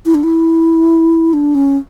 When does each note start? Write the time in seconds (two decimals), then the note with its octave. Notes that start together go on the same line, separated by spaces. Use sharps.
0.06 E4
0.14 D4
0.23 E4
1.33 D4
1.55 C#4